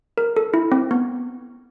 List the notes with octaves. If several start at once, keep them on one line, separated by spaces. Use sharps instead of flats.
A#4
A4
E4
C4
B3